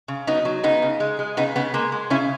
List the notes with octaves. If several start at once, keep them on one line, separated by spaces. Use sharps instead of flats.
C#3
F#3 B3 D#4
F#3
C#3 B3 D#4
C#3
G#3
G#3
C#3 B3 D#4
C#3 B3
G#3 A#3
G#3
C#3 C#4 E4